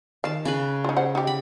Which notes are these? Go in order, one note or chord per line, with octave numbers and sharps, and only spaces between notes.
D#3 F5 A5
C#3 B4
D#4 F4
C5 F#5
D#4 G4
B5